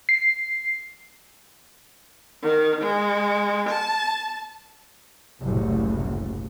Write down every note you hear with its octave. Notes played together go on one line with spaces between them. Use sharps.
C7
D#3
G#3
A5
F#1 C2 A2